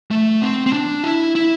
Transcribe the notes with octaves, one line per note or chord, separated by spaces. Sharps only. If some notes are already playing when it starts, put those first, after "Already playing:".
A3
C4
C4
D4
E4
E4